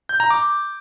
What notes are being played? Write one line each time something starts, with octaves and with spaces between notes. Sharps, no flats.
G6
A#5
D6